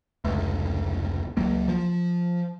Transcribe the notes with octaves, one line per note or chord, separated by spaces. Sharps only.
F1 C#2
C#2 F#3 A#3
F3